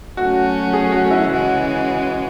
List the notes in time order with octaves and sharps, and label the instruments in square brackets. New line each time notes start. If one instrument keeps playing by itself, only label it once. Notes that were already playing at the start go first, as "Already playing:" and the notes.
[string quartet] F#3 A3 C#4 [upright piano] F#4
[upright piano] G#4
F#4
E4
[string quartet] C#3 E3 G#3 C#4 [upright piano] F#4